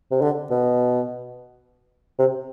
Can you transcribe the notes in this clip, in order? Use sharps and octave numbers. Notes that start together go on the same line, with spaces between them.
C3
D3
B2
C3